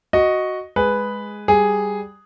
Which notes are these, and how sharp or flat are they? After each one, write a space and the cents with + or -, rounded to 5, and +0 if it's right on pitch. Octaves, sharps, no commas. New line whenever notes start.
F#4 +0 D#5 +0
G#3 +0 G#4 +0 B4 +0
G3 +0 G#4 +0